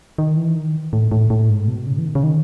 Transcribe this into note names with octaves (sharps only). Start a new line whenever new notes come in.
D#3
E3
D#3
A2
A2
A2
G#2
B2
C#3
E3
D#3
C#3
D#3